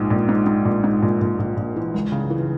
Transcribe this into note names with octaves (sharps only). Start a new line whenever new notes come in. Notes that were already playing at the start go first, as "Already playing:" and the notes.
Already playing: A#1 G#2
A#1
G#2
G#2
A#1
G#2
A#1
A#1
A#1
A#1
E3
C#2
C#3
E3